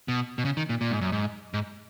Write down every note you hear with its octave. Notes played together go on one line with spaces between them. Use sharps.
B2
B2
C#3
D#3
A#2
A#2
G#2
F#2
G#2
G#2